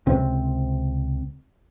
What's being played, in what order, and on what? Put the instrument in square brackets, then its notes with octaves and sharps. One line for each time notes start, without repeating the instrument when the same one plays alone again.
[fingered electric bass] C#2 C3 C4